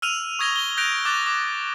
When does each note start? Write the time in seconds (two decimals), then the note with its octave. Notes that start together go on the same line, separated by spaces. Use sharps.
0.02 E6 F6 D#7 F7
0.39 C#6 D#6 G#6 A#6 D#7 G7
0.56 G7
0.77 F#6 G6 A#6 D7 F7
1.05 D6 F#6 A6 G7
1.27 D6